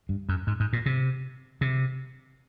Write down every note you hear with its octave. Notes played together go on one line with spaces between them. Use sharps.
G2
F#2
G#2
G#2
A#2
C3
C3